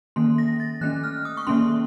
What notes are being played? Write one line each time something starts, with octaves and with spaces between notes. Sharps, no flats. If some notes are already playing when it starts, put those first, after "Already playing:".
D#3 A#3 C#4 C6
A#6
A6
D#3 A3 C#4 F#6
F6
D#6
C#6
D#3 A#3 C#4 C6